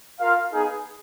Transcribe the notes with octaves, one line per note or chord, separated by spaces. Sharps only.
F4 A#4 F5
B3 D#4 G#4